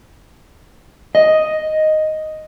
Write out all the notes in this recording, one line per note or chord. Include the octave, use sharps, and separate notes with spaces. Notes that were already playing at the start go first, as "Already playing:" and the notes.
D#5